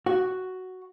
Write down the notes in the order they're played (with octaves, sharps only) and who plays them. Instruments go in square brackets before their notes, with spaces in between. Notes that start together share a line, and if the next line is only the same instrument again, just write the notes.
[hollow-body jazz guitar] F#4